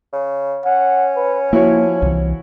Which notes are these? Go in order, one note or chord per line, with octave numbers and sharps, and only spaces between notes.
C#3
C#4 F#5
B4
F3 A#3 E4 F#4 C#5
C2 E3